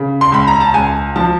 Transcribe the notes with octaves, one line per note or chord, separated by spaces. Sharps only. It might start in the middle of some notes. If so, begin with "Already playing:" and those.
Already playing: C#3
C6
C#2 B5
A#5
A5
C#2 G#5
F3 A5